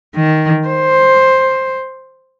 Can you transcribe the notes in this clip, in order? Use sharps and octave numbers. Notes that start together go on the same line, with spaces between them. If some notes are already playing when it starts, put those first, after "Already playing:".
D#3
C5